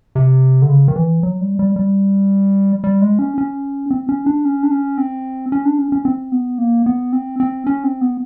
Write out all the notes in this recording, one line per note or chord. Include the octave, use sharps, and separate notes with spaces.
C3
D3
C#3
D#3
E3
F#3
G3
G3
G3
G3
G#3
C#4
C#4
C4
C#4
D4
C#4
D4
C#4
C4
C#4
D4
C#4
C#4
C4
B3
A#3
B3
C4
C4
C#4
C4
B3